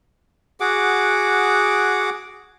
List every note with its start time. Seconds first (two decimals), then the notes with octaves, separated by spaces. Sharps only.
0.60 F#4 G#4 F#5 D6